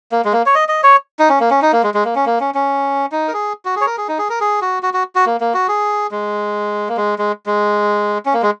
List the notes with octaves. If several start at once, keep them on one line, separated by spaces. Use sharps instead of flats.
A#3
G#3
A#3
C#5
D#5
D#5
C#5
D#4
C#4
A#3
C#4
D#4
A#3
G#3
G#3
A#3
C#4
A#3
C#4
C#4
D#4
A#4
G#4
F#4
G#4
C#5
A#4
G#4
D#4
G#4
A#4
G#4
F#4
F#4
F#4
F#4
A#3
A#3
F#4
G#4
G#3
A#3
G#3
G#3
G#3
C#4
A#3
G#3